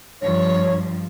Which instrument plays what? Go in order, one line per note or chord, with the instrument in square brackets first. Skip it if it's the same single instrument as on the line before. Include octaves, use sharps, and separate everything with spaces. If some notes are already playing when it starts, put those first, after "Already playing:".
[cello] G2 F3 [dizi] C#5